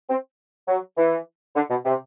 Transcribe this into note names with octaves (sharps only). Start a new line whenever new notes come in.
C4
F#3
E3
D3
B2
C3